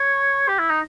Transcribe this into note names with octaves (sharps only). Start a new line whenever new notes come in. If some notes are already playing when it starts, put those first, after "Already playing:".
Already playing: C#5
G4
E4
D#4